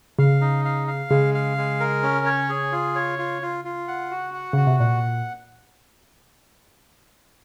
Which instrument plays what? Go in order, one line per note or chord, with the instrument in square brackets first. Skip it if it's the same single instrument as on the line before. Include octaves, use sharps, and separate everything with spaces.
[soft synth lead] C#3 [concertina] F5
[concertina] D#4
F5
F5
[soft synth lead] C#3 [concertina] G#3
[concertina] F5
G#3
A#4
C#4
C#5
G#4
F4
C#5
F4
F4
F4
F#5
F#4
F#5
[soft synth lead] C#3 [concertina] F#4
[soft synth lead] C3
[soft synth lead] A#2 [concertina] F#5